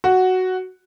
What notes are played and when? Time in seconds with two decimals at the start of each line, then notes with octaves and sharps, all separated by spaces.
0.04 F#4